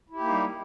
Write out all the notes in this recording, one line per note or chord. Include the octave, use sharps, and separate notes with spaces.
G3 A#3 D#4 E4 G4